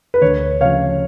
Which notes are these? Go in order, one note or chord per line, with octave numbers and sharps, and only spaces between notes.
B4
D2 C#5
C#3 F3 C#5 F5